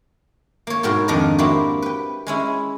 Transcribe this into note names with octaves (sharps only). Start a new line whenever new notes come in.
A#3 C#5
G#2 B2 F#4 A#4 G5
F2 D#3 D4 D#4 A#4 A#5
A#3 C4 E4 F#4 G4
B4 G5
G#3 C#4 E4